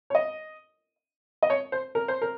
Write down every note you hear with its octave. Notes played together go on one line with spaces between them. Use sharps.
C#5
D#5
D#5
C#5
C5
A#4
C5
A#4